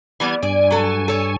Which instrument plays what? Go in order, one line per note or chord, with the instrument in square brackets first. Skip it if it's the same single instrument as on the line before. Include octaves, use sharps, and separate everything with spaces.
[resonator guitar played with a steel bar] E3 G3 B3 [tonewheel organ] G#6
[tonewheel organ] G2 G#5 [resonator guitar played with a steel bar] D5
[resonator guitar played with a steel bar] F#3 A4
A4 C#5